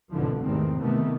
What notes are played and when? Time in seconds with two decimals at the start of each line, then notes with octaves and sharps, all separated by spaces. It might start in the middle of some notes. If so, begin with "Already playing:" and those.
0.10 G#1 C#2 B2 D3 E3 F3
0.42 G#1 E2 C3 D#3 A3 C4
0.77 C3 D#3 E3 A3 B3